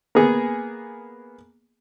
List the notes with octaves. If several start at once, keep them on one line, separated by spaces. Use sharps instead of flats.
A#3 B3 G#4